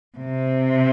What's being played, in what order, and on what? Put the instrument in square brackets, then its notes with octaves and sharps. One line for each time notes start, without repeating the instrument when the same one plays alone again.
[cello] C3